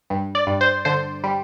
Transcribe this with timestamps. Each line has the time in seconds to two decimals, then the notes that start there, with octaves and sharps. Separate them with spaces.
0.10 G2
0.35 D5
0.47 G2
0.61 C5
0.85 D3 C5
1.24 G3